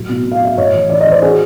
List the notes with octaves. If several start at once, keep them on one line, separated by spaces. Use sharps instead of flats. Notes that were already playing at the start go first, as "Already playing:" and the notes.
Already playing: A2 F#3
B2
B2
F5
F#3 E5
A2 C#5 D#5
E3
E3 D5
D#5
E3 C5 D5
F#4 G#4